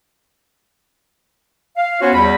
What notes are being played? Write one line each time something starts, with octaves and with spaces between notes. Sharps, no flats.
F5
B3 C#4 F4 F#4 C5 C#5
E2 G3 D#5 B5